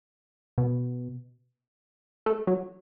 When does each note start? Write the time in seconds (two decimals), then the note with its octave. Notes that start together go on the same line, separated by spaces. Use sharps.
0.58 B2
2.26 A3
2.47 F#3